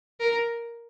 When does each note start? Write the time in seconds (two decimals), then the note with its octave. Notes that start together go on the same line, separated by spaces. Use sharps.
0.20 A#4